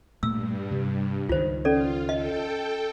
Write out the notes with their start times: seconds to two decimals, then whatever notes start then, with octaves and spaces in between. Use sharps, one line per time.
0.23 G2 A#2 A3 A#3 E6
0.71 C3 G3
1.29 C#2 D#3 F4 C5
1.65 C#4 F4 A4 D5
2.09 A4 D#5 G5